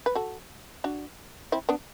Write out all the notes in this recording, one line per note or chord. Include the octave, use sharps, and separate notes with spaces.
B4
F#4 A4
D4 F#4
C4 E4
B3 D4